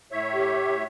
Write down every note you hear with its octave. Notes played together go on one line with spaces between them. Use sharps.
A2 C#5 E5
G4